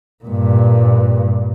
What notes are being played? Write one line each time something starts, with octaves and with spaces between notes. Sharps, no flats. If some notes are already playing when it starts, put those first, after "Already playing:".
G2 A#2